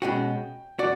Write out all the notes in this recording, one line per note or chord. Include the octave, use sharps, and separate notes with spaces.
B2 G#3 C#4 F#4 G5
F#4 D5